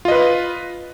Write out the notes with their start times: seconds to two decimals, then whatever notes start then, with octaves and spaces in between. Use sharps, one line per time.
0.05 F4
0.08 D#5
0.11 B4